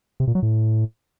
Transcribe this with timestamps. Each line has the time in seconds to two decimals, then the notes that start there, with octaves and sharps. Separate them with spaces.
0.20 C3
0.27 A#2
0.35 F#3
0.43 A2